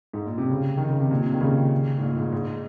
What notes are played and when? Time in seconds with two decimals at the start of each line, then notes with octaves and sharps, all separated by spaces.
0.13 G#2
0.26 A#2
0.38 C3
0.49 C#3
0.77 D#3
0.89 C#3
1.00 C3
1.11 A#2
1.26 C3
1.34 D#3
1.41 C#3
1.98 G#2
2.01 A#2
2.17 G#2
2.32 G#2